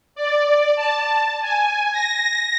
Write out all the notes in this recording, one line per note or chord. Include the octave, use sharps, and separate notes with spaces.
D5
A5
G#5
A#6